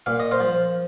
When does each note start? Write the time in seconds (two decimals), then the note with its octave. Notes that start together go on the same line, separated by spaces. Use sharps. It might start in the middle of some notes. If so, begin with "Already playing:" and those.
0.06 A#2 F5
0.20 D#5
0.31 C5 F5
0.40 F3